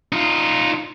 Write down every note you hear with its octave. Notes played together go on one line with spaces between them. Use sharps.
D#4 F4